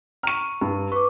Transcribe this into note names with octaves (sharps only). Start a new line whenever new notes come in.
A#5 C#6 F6 D#7
G2
B4 C#6 D6